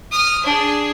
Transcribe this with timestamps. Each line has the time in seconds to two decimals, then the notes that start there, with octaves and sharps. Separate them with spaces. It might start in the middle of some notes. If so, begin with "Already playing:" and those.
0.12 D#6 F6
0.44 D4 G#4